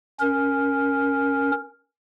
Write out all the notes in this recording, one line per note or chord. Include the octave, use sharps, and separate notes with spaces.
C#4 A#4